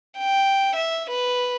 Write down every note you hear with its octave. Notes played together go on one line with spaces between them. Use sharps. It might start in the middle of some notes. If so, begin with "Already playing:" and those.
G5
E5
B4